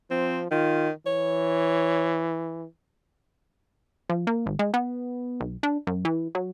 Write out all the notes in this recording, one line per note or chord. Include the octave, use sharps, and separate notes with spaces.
F3 C4
D#3 F4
E3 C#5
F3
A#3
G#1
G#3
B3
B1
D4
F#2
E3
F#3